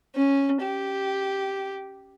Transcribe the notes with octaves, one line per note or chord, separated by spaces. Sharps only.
C#4
G4